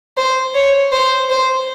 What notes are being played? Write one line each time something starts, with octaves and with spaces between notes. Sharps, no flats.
C5
C#5
C5
C5